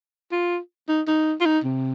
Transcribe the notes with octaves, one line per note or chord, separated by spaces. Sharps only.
F4
D#4
D#4
F4
D#4
C3